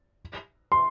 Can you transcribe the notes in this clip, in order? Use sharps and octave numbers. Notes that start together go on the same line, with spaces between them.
C6